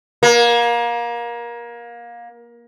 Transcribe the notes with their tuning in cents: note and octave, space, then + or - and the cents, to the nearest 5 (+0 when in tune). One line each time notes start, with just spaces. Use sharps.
A#3 +25